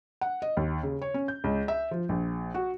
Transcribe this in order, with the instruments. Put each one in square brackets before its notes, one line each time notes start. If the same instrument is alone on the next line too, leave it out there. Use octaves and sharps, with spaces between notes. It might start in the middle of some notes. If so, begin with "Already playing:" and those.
[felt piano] F#5
D#5
D#2
C#3
C#5
C#4
G6
C#2
E5
F3
A#1
F#4